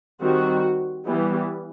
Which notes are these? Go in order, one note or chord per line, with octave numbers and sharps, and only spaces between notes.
D#3 G3 C4 F#4
E3 G3 B3